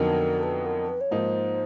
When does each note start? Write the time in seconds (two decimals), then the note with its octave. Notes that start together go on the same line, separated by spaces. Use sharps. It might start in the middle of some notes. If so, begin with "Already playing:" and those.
Already playing: F2 D3 F#3 B3 D#4 A#4
0.43 B4
0.65 A#4
0.89 B4
1.01 C#5
1.11 G#2 F3 A#3 D#4 C5